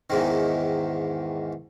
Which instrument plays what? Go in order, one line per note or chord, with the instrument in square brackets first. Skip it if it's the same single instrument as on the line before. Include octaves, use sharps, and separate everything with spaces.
[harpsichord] E2 G#2 D#3